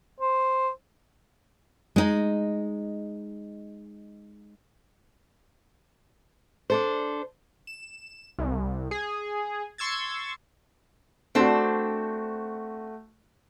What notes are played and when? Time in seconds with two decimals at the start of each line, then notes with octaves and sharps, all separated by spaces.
0.21 C5
1.96 G#3 D#4
6.70 D4 A4 C5
7.67 E7
8.39 C2
8.91 G#4
9.78 C6 C#6 E6 G#6 A6
11.35 A3 C4 D4 F#4 C5